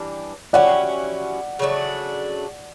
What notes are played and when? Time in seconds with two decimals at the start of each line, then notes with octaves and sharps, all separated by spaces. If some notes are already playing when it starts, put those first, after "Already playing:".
Already playing: E3 G3 D4
0.53 F#3 C#4 E4 G4 D5 F#5
1.59 C#3 F#3 A3 D4